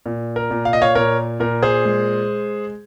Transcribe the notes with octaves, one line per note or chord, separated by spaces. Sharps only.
A#2
A#4
A#2
F5
D#5
C#5 F5
A#2 A#4 C#5
A#2 A#4
G#4 C5
G#3